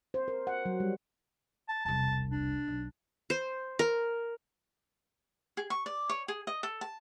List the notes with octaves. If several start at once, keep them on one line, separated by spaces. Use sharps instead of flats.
C5
A#4
F#5
F#3
G3
A5
E1 C2 A5
D4
B1
C5
A#4
G#4
C#6
D5
C#5
G#4
D#5
A4
A5